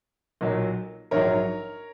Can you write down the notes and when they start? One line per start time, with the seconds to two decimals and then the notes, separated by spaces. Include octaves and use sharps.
0.41 B1 A#2 F#3
1.11 A#1 G#2 F#3 A#4 C#5